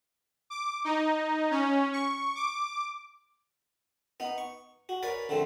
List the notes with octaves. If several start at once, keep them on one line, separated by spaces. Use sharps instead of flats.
D6
D#4
C#4
C#6
D6
B3 D#4
C#6
F#4
A#4 B4 C#5 D5 G#5
A#1 D3 A3 C4